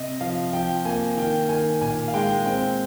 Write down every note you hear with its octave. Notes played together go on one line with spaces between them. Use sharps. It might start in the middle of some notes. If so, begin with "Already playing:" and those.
Already playing: C3 D#5
F3 F5
F3 G5
A#3 G#5
D#3 G5
D#3 G#5
A#2 G#5
F5
G#3 G5
C4 G5